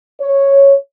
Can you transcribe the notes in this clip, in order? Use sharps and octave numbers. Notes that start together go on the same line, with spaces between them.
C#5